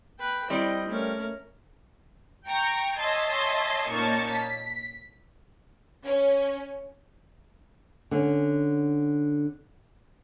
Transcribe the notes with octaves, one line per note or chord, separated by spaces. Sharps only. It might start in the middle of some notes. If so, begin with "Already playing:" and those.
B4 G5
G3 C4 E4 D5 D#5
A3 C#4 A#4
G5 A#5 C#6
C#5 D#5 E5 G#5 A5 C6
A#2 A#3 C#4 D#4 A5 C#6
B6
C#4
D3 C#4